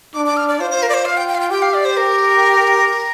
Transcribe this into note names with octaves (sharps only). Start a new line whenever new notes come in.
D4 D6
D6
F6
D5
F4 C5
C5
A#4
D5
C5
F5
G5
G5
F5
G5
G4 G5
F5
D5
C5
A#4